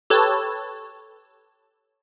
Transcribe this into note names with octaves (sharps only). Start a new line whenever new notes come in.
G4 A4 B4 C#5 A5